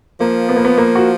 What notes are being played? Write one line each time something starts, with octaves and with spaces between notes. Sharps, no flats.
F3 A#3
B3
A#3
B3
A#3
F#4